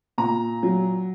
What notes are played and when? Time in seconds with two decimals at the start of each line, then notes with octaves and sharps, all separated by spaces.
0.18 A#2 A#5
0.63 F#3